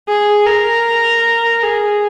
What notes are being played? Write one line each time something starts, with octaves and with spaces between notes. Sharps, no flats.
G#4
A#4
G#4